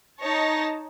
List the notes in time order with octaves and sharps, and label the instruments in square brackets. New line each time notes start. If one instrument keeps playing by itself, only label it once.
[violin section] D#4 C#5 A5 A#6